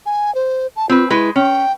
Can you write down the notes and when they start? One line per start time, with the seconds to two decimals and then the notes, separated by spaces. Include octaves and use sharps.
0.06 G#5
0.35 C5
0.76 A5
0.89 C4 F4 B4
1.10 G#3 E4 B4
1.36 C#4 G5